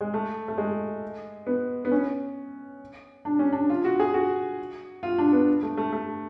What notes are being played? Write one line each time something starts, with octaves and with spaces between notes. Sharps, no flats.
G#3
A3
A3
G#3
B3
B3
C#4
D4
C#4
D4
F4
F#4
G#4
F#4
F4
D4
B3
A3
A3
A3